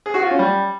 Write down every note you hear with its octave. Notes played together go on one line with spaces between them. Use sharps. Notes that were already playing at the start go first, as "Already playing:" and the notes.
G#4
F#4
F4
C#4
G3